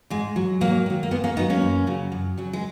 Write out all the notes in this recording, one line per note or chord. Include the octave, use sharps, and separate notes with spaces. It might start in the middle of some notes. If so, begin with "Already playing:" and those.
G#2 G#3
F#3
G#2 F#3 A#3
D#3 F#3
A#3
G#2 G#3 B3
A#3 C#4
D#3 F#3 B3 D#4
A#3 C#4
F#2
C#3 F#3
F#2
C#3 F#3
G#3